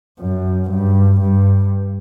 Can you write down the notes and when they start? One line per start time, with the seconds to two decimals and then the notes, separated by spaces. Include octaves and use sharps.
0.20 F#2
0.70 G2
1.21 G2